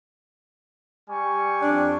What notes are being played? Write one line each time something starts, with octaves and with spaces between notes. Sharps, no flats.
G3 G#5 C#6
F2 D4